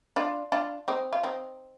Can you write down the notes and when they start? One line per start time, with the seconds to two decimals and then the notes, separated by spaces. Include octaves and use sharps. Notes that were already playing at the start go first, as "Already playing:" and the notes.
0.16 D4 F4
0.52 D4 F4
0.88 C4 D#4
1.13 F4
1.23 C4 D#4